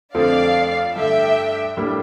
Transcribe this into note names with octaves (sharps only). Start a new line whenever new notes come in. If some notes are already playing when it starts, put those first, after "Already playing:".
F2 D3 F3 A3 C4 D5 F5
G2 D3 A3 E5 G5
A2 G3 A#3 D4